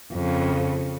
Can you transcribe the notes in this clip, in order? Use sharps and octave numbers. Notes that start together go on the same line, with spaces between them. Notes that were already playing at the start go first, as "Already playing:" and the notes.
F2 C#3